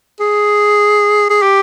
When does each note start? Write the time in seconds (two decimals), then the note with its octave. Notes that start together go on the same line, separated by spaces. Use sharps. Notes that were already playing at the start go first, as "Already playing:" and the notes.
0.20 G#4
1.30 G#4
1.42 G4